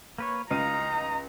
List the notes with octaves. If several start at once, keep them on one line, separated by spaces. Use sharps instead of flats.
A#3 B4 C#5
C#2 D#4 F5 A#5 D#7